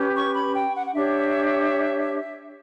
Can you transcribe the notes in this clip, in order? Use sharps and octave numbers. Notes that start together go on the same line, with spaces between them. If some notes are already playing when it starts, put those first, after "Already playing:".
Already playing: C#4 G4 B4
C#6
B5
G5
F#5
F#5
D4 G4 C#5 E5